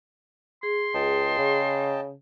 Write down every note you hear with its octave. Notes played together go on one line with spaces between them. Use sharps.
G#4 C6
C#2 D#5 G5 A5
C#3